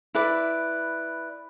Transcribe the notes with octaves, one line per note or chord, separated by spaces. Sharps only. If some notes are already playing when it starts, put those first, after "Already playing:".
E4 B4 D5